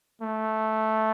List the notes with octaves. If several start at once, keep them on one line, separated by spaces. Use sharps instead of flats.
A3